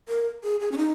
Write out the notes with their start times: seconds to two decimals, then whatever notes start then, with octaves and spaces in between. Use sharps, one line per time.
0.09 A#4
0.43 G#4
0.60 G#4
0.72 C#4
0.78 D#4